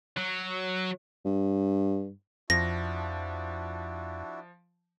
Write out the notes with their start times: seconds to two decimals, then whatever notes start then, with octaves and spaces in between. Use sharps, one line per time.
0.17 F#3
1.25 G2
2.50 F2 F3 D4 E4 F#4 A#6